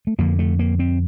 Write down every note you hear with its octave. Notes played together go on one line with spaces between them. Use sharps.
A3
F2 D3 A#3
A3
A#3
C4